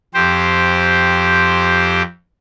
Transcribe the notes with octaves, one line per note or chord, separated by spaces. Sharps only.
F2 G4 C5